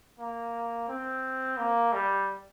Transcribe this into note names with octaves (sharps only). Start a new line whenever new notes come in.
A#3
C4
A#3
G3